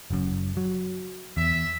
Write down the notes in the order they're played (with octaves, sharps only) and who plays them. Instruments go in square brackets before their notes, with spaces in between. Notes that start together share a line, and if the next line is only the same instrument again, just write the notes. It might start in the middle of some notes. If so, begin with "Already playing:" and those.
[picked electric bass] F#1 F#2
F#3
[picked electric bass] E2 [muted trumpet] E5